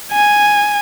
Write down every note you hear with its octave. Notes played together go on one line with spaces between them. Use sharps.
G#5